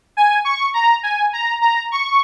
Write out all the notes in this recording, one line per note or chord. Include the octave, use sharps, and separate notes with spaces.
G#5
C#6
A#5
G#5
A#5
A#5
C#6